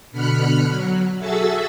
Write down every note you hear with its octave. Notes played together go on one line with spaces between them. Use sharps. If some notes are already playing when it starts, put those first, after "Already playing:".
B2 D3 B5 F6 F#6 C#7
F#3
F#4 G#4 A4 E5 E6 A6